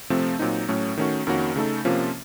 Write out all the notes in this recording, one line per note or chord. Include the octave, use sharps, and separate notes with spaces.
C3 F3 A3 C4
A#2 F#3 C4 D#4
A2 F#3 A3 C#4
D#3 A3 C#4 F#4
F2 D#3 A#3 C#4 F#4
C#3 A3 D#4 A4
C3 F3 A#3 C#4 F4